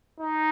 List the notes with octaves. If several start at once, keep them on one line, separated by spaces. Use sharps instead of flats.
D#4